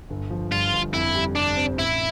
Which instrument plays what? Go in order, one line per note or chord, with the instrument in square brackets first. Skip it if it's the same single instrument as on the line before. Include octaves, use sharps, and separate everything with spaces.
[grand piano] G1
F3
[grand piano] G2 [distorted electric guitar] F4
[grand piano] G1
[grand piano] F2 [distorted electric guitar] E4
[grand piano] G3
[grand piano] C3 [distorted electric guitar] D4
[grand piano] C4
[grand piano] A1 [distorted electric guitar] E4